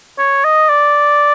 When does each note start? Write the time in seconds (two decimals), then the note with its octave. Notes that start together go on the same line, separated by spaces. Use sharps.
0.19 C#5
0.45 D#5
0.70 D5